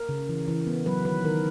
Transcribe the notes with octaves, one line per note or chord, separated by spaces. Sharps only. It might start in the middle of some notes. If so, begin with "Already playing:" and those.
Already playing: A#4
C#3
E3
E3
B3
F#3 B4
D#3 B4
D#3 A#4